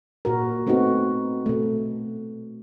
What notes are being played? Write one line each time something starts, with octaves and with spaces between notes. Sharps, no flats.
A#2 F#4 A#4
A3 B3 C4 D#4 F#4
B2 A3